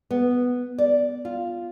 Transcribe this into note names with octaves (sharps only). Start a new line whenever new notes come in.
B3
D5
F4